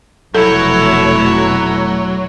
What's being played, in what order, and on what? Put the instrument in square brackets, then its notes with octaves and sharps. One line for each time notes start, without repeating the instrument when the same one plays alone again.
[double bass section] F1 B2 A3 [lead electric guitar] F#3 [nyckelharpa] E4 C#5 [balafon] A4